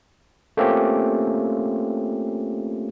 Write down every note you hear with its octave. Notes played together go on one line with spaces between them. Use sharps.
A3 A#3 C4 C#4 F4 G4